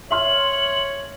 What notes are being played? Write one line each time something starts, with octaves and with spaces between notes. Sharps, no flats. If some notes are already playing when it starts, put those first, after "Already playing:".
C#5 E5 C6 F6 F#7